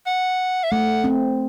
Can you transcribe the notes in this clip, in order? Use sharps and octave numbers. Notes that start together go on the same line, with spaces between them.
F#5
E5
A3 F#5
C4